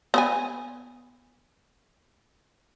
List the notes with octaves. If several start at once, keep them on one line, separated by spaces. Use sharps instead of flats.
B3 C#5 G#5